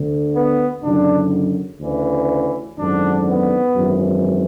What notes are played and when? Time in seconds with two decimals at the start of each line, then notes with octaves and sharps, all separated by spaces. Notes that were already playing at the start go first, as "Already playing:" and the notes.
Already playing: D2 D3
0.35 B3
0.83 F#1 F#2 D3 D4
1.80 D2 C#3 E3
2.78 G#1 F#2 D3 D4
3.27 B3
3.75 G#1 F#2 E3